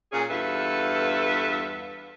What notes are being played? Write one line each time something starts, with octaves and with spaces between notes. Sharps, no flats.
A#2 C#4 G#4
E2 G2 F4 A4 B4 E5